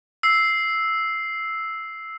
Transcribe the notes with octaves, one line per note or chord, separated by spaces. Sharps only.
E6 C7